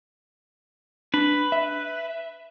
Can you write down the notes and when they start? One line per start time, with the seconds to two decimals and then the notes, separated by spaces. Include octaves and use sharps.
1.14 D4 B4
1.52 E5